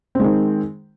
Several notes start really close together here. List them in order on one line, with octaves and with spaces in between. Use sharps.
C4 G#3 D#3